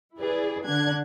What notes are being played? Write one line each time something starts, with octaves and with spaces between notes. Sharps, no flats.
E4 G#4 B4 D5
D3 D4 F#6 G#6